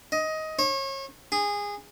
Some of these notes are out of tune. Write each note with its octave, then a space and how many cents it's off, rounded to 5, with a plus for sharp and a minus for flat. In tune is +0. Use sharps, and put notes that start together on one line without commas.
D#5 +15
C#5 -35
G#4 -20